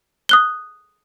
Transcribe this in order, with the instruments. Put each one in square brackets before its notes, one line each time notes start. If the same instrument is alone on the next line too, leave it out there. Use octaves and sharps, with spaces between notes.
[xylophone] D#6 F#6 G7